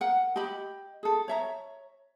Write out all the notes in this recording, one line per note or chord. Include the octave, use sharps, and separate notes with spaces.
A#4 F#5
G4 D#5 G5 B5
G#4 A4
C#5 E5 A#5